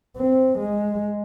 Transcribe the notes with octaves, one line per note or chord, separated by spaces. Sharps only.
C4
G#3